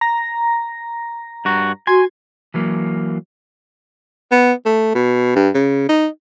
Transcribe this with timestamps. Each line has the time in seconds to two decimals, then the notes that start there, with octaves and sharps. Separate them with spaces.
0.01 A#5 A#6
1.45 G2 F#4
1.87 F#4 G#5 C6 G#6
2.54 E3 F#3 A#3
4.32 B3
4.65 A3
4.95 B2
5.36 G2
5.54 C#3
5.89 D#4